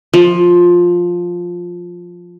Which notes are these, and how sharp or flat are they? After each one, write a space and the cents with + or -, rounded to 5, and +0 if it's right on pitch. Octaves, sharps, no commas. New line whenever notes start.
F3 +10